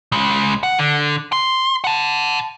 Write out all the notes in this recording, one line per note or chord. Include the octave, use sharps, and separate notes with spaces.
C#3 G#3
F#5
D3
C6
F#5 A5